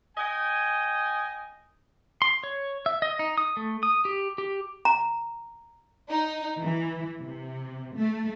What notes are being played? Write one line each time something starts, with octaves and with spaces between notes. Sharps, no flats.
D#5 G5 G#5
C6
C#5
E5
D#5
D#4
D#6
A3
D#6
G4
G4
A#5
D#4
E3
C3
A3